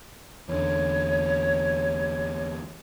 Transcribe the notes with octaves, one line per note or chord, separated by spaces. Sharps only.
E2 D3 C#5